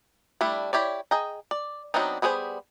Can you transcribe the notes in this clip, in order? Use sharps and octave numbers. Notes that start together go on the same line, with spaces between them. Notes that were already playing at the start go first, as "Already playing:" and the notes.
G3 A3 D4 E4
E4 G4 C#5 D5
G#4 D#5 G5 A#5
D5
F#3 B3 C4 D4 D#4
G3 B3 G#4 A#4 C5